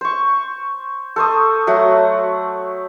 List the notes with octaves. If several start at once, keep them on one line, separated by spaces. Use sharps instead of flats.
C5 C#6
A4 C5 C#6 D#6
F#3 A3 F#5